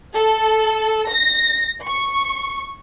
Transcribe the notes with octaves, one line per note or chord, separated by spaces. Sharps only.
A4
A#6
C#6